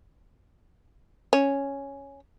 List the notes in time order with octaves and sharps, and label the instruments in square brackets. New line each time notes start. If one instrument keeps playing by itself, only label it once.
[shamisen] C#4